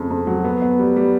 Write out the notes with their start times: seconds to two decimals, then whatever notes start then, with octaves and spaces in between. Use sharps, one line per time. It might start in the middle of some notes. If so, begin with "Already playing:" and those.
Already playing: F2 C#3
0.10 F2
0.27 F#3
0.44 B3
0.62 B3
0.79 G3
0.96 G3